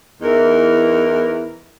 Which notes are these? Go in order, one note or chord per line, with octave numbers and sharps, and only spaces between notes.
E2 E3 D#4 A#4